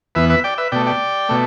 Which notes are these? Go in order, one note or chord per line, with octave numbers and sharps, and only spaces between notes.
E2 E3 B3 B4 E5
B4 E5
D5 G5
B4 E5
B2 A3 D5 G5
D5 G5
B2 A3